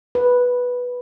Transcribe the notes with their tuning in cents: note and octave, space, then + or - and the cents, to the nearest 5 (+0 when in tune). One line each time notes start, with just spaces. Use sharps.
B4 -5